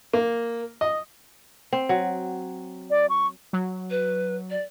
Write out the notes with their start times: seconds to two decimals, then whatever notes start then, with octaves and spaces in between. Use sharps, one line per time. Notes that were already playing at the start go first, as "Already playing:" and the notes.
0.13 A#3
0.81 D#5
1.73 C4
1.89 F#3
2.90 D5
3.10 C#6
3.53 F#3
3.91 B4
4.50 D5